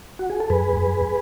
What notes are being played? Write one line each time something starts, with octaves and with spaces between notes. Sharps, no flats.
F#4
G#4
A4
F#2 G#4 B4
F#2